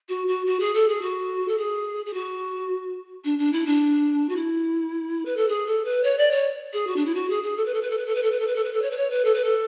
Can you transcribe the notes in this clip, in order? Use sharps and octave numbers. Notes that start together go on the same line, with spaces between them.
F#4
F#4
F#4
G#4
A4
G#4
F#4
A4
G#4
G#4
F#4
D4
D4
E4
D4
F#4
E4
B4
A4
G#4
A4
B4
C#5
D5
C#5
G#4
F#4
D4
E4
F#4
G#4
G#4
A4
B4
A4
B4
A4
B4
A4
B4
A4
B4
A4
B4
A4
B4
A4
C#5
B4
C#5
B4
A4
B4
A4